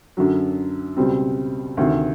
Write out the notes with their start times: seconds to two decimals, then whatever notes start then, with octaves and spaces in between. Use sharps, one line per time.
0.17 F#2 D3 F#3
0.97 C#2 B2 G3 C4
1.77 D2 C3 D#3